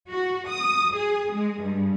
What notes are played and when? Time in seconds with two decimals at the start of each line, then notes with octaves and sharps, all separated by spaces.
0.10 F#4
0.49 D#6
0.95 G#4
1.32 G#3
1.62 G2